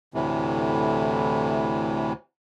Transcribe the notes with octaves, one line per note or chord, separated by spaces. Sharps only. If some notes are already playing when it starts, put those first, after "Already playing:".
D2 A2 C3 E3